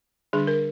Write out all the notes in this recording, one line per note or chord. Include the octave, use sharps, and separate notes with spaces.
D3 G3 D4 G#4
A#4